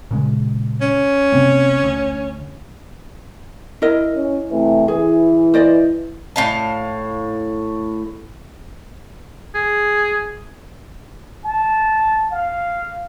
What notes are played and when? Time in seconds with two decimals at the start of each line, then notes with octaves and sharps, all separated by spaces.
0.11 A#2 C#3 G#3
0.81 C#4
1.32 C3 A#3 C4
1.84 D2
3.82 E4 A#4 D#5
4.16 C#4
4.51 C3 E3 A3
4.88 E3 G#4
5.54 C5 D5 D#5
6.36 A2 F5 A5
9.55 G#4
11.45 A5
12.31 F5